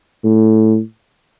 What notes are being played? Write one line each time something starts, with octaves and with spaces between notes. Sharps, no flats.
A2